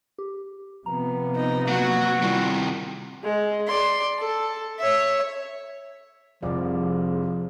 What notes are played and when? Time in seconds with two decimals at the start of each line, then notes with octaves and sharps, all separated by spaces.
0.18 G4
0.86 C3 F3 B3 A#5
1.37 D#4
1.68 F#3 A#3 F#4
2.22 C3 D#3 G3 E4 F4
3.24 G#3
3.67 D5 C6
4.18 A4
4.79 C#5 E5
6.43 F1 C2 C3 F3 G#4 D5